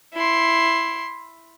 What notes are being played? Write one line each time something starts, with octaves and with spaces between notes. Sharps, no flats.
E4 C6